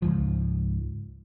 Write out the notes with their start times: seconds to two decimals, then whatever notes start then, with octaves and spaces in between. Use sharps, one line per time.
0.02 C#2 G#2 F3